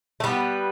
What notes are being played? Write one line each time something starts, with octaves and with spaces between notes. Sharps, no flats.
A3
G3 B3